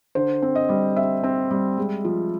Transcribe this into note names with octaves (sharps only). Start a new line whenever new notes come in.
D3 C5
C4
D#5
G3
C4 E5
C4
G3
G#3
F3